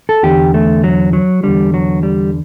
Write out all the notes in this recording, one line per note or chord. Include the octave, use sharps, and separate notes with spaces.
A4
E2 D3 G4
A3
F#3
F#3
E2 D3 G3
F#3
G3